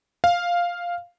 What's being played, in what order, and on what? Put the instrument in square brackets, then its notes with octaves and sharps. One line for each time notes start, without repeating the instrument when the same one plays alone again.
[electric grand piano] F5